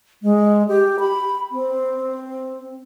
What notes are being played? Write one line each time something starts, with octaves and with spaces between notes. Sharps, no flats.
G#3
G4
B5
C4